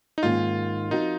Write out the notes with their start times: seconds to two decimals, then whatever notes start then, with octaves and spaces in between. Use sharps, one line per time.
0.18 D#4
0.23 G#2 D#3 A#3 C#4 F4 G#4
0.91 F3 C4 D#4 F#4 A#4